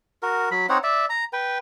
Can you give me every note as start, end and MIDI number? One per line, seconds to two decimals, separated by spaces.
0.23 0.49 66
0.23 0.49 70
0.51 0.67 54
0.51 0.67 83
0.69 0.78 60
0.69 0.78 63
0.69 0.78 73
0.69 0.78 78
0.83 1.06 74
0.83 1.06 76
1.10 1.25 82
1.33 1.58 71
1.33 1.58 79